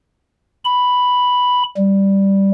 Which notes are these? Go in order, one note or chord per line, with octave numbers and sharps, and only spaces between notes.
B5
G3